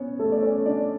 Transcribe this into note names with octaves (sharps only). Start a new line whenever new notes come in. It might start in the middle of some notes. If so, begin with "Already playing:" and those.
Already playing: B3 C#4 C#5
A3 A4
D5
C#4 C#5
D4 D5